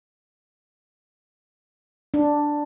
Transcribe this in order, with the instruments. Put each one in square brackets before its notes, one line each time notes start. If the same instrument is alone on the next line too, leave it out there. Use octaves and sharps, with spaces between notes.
[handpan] D4